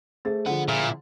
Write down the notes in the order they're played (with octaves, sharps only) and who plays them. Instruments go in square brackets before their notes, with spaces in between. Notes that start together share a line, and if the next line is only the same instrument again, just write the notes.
[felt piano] A3 A6 [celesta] G#4 C5
[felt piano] D3 F3 [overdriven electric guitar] B4 F#5
[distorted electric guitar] A#2 [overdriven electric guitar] E4